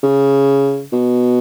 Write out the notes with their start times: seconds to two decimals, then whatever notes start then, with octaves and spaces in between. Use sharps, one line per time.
0.03 C#3
0.92 B2